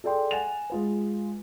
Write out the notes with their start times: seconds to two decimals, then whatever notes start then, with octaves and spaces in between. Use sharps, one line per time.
0.04 G#4 A4 D5 G5 C6
0.31 F#5 G#5 A6 E7 F7
0.70 G#3 F4 B4